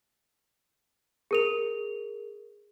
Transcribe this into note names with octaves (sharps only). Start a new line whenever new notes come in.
G#4 A#4 F7